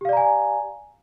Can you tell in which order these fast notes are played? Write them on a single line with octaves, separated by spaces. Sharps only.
G4 F5 D5 A#5 G#5